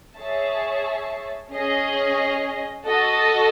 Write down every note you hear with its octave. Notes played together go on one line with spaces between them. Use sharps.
G#4 C#5 E5 A5
C#4 G#4 D#5
F#4 A4 D#5 A5